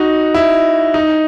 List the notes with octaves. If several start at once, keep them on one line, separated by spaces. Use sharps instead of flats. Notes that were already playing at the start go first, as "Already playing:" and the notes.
Already playing: D#4 F#4
E4
D#4